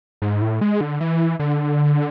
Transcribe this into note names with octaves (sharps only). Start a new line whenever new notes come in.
G#2
A2
G#3
D3
E3
D3